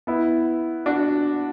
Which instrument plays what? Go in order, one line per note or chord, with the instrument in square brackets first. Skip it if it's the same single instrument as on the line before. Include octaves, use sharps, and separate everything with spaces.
[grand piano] B3 E4
D4 F#4